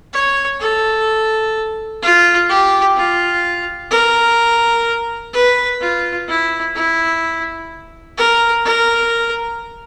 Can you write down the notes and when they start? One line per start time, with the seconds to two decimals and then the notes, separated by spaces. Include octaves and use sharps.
0.13 C#5
0.60 A4
2.02 F4
2.49 G4
2.97 F4
3.92 A#4
5.33 B4
5.81 F4
6.28 E4
6.75 E4
8.18 A#4
8.65 A#4